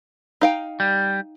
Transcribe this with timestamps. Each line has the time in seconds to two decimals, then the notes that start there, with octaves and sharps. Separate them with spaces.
0.41 D#4 F5 G5
0.80 G3